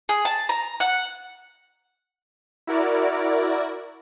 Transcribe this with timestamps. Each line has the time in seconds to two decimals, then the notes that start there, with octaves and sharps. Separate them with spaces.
0.09 G#4
0.25 A5
0.49 A#5
0.80 F#5
2.67 E4 F#4 A#4 D5